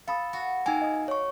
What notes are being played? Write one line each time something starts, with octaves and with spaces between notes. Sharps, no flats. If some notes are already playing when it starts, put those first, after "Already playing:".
A4 F5 B5 D#6
F#4
A#3 D#4 G5 G#5
D#5 D#6
C#5 C#6